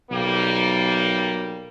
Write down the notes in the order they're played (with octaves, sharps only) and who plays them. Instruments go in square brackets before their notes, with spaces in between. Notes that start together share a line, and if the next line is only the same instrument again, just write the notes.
[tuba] B1 [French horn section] G3 A#3